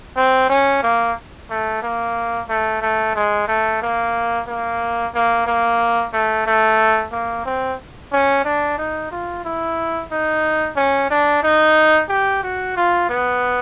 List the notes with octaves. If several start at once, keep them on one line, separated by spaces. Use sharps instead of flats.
C4
C#4
A#3
A3
A#3
A3
A3
G#3
A3
A#3
A#3
A#3
A#3
A3
A3
A#3
C4
C#4
D4
D#4
F4
E4
D#4
C#4
D4
D#4
G4
F#4
F4
B3